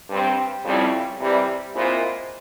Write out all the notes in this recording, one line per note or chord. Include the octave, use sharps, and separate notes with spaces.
G2 G3 C4
F2 C#3 G3 C4 E4
C3 E3 G3
A#2 G#3 C4 E4